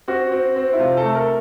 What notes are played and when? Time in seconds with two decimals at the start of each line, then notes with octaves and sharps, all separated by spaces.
0.08 C4 F#4
0.31 C4
0.56 C4
0.73 E4
0.79 C3 F4
0.97 A4
1.03 A3
1.15 A#4